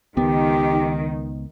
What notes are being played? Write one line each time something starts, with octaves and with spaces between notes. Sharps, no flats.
C#2 D#3 B3 G4